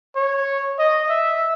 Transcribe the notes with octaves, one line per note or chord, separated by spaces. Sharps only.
C#5
D#5
E5